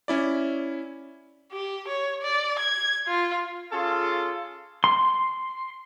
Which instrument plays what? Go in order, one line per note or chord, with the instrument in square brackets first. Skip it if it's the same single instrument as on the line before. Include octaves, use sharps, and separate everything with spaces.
[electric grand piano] C#4 E4 D5
[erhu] G4
C#5
D5
G#6
F4
[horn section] C#4 F4 G#4 A4
[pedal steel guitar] C6